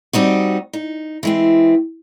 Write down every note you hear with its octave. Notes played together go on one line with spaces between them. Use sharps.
G3 C4 D#4 F#4
D#4
E3 G#3 C4